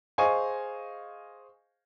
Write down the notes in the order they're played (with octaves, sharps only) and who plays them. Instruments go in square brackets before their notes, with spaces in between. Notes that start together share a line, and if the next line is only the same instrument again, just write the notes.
[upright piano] G#4 C5 D#5 F5 G#5 C#6